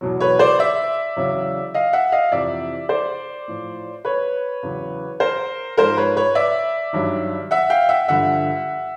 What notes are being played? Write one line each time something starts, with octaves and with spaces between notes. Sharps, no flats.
E2 B2 F#3
B4 C#5
C5 D5
D5 E5
E2 C#3 F#3
D#5 F5
E5 F#5
D#5 F5
F2 C3 E3 D5 E5
C5 D5
A2 F3
B4 C#5
E2 C#3 F#3
A#4 C5
G#2 F3 A#4 C5
B4 C#5
B4 C#5
D5 E5
G2 D#3 F#3
E5 F#5
F5 G5
E5 F#5
G2 D3 F3 E5 F#5